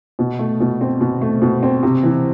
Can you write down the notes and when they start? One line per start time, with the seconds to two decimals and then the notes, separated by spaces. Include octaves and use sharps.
0.19 B2
0.39 A3
0.61 B2
0.81 C4
1.01 B2
1.22 A3
1.42 B2
1.63 C4
1.83 C3
2.03 E3